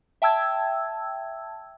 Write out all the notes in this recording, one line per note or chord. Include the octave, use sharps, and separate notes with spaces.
E5 G5 A5 E6 G#6